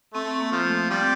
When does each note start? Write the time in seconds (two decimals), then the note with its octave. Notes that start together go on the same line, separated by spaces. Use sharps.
0.14 A3 C4
0.40 A#3
0.52 F3
0.65 A3
0.90 G3 C4